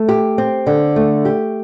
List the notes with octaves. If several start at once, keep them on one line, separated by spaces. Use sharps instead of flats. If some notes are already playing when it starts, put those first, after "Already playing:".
Already playing: A3
G4
C4
D3
A3
G4